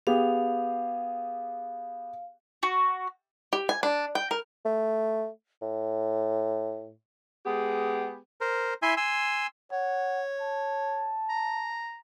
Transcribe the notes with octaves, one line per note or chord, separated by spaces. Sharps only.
B3 G4 G#4 F5
F#4
G4
G#5
D4
G5
A#4
A3
A2
G#3 B3 G4 G#4
A#4 C5
E4 E5 G#5 C6
G#5 C6 E6
C#5 F#5
A5
A#5